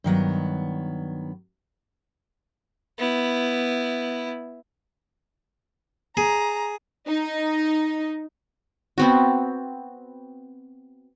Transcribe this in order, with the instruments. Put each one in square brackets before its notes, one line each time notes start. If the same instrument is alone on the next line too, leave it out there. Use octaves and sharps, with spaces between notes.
[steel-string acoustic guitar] G2 D#3 F#3 B3
[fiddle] B3 E4
[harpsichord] G#4 [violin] A#5
[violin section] D#4
[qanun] B3 C4 F#4